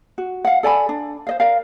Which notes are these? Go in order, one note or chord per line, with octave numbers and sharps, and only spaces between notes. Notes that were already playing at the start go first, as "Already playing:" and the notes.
F#4
F5 F#5
A4 D5 G#5 B5
D4
C5 D#5 F5
A#4 D5 F5